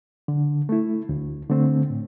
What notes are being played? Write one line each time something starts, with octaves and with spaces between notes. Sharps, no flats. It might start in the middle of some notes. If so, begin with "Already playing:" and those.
D3
A3 E4
D2
D3 A3 C4
A2